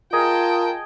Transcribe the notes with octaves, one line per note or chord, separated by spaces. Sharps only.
F4 G#4 A#4 D#5 G5 A5